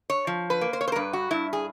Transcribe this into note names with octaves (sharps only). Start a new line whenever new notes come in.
C#5
F3
B4
A#3
C5
C#5
C5
A#4
G2 B4
F#4
G2 E4
G#4